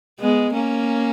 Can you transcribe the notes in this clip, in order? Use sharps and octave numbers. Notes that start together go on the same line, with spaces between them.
G#3 B3
A#3 C#4